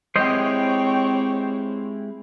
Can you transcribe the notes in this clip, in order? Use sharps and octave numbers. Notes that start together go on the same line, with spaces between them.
G#3 C4 E4 G4 C5 C#5 D#5 G5